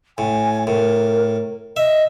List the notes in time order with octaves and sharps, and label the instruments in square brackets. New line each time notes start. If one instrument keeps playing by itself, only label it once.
[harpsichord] A2 [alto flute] G#5
[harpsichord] A2 [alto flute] A#4
[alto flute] D#5 [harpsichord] E5